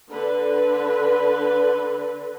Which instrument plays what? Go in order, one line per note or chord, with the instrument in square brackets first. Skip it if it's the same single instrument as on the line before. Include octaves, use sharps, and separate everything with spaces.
[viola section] D3 B4